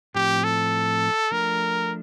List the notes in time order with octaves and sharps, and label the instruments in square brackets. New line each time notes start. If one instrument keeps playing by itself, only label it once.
[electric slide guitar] A2 F3 C4 [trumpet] G4
[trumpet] A4
[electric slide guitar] F3 A3 D4 [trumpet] A#4